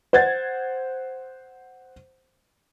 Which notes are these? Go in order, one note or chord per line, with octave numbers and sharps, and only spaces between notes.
C5 F#5 G#6 A6